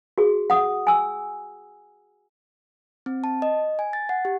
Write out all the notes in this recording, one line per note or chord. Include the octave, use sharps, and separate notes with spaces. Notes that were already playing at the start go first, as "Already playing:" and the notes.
F#4 G#4
F#5 D#6
G#5 E6
C4
A5
D#5
G#5
A6
F#5
G4